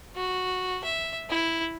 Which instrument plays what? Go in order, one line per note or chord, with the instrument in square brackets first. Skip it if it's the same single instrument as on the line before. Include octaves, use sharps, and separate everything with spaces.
[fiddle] F#4
E5
E4